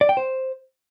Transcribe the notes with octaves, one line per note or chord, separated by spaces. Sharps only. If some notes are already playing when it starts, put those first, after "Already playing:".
D5
G5
C5